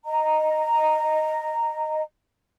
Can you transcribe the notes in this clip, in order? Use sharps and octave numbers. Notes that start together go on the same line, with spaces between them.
D#5 A#5